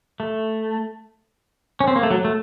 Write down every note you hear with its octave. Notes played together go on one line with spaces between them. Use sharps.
A3
C#4
C4
A#3
A3
F#3
A3